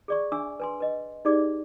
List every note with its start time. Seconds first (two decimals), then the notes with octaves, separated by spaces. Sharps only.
0.08 G#4 D5 C#6
0.32 D4 E5 G#5 D6 E6
0.60 B4 G#5 C6
0.80 B4 D#5
1.25 D#4 G4 G#4 D5 D6